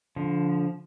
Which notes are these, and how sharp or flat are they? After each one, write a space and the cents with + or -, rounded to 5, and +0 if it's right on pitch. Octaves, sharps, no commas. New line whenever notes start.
D3 -25 F3 +0